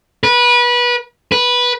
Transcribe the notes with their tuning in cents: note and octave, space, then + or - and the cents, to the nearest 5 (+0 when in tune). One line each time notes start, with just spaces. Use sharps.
B4 -25
B4 -10